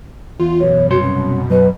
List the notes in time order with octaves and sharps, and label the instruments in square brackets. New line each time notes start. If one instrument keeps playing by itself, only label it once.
[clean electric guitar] E2 [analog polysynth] F4
[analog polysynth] F#2 B2 [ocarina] C#5
[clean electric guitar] C2 C#5 C6 [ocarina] F#4
[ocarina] C#4
[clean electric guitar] F#3 D#5 [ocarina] B4